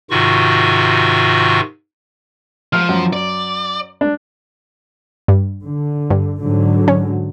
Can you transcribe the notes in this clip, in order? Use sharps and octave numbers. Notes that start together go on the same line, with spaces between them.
G#2 C3 D#3 F4 F#4 C#6
F3 F6
F#2
D5
D4
G2
D3
G2
G#2 D3 F#3
C#4